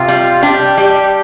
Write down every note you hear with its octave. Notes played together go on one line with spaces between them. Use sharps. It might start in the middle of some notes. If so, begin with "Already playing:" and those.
Already playing: C3 F4
G3
D4 G4
G3